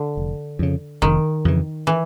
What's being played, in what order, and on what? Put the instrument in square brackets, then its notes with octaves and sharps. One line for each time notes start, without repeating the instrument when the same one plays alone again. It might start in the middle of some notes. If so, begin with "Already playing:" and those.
Already playing: [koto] D3
[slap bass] F1
F2 C#3
[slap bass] F1 [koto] D#3
[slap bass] F2 C#3 E3
[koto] E3